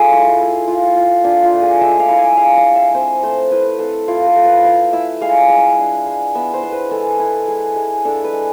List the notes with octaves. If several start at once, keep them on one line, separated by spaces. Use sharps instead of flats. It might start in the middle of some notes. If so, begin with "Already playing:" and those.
Already playing: A3 F4 G#4
E4
E4
F4
F4
D4 F4
F4
A3
G#4
G#3 E5
F5
E4
G#5
G#3 F5
F5
G#3
E5
C4 C5
A3 C5
E4 B4
C4 A4
E4 F4
A4
A3
B4
E4 F5
E4 E5
G#3 F5
G#3
D4
G#3
B3 E5
C5
B3
B4
G#3 A4
E4
G#3
G#3
D4 A4
B4
G#3